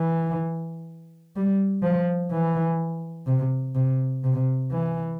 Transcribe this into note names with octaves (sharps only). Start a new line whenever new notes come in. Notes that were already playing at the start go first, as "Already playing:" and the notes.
Already playing: E3
G3
F3
E3
C3
C3
C3
E3